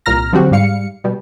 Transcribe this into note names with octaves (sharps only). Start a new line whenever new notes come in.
C2 A#2 A#5 F6 A#6
D3 F3 F#3 C4 F#4 G4
G#2 G3 F5 C#7
B2 G3